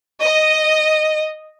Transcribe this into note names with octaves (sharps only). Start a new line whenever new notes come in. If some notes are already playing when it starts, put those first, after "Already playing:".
D#5